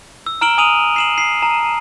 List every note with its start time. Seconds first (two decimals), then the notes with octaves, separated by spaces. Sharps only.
0.26 E6
0.41 A#5 F6 D7 E7 F#7 G7
0.58 G#5 D#6 D#7 F7 F#7
0.96 C7 E7 F#7
1.18 C7
1.42 A5 A#5